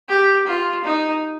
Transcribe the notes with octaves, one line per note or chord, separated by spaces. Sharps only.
G4
F4
D#4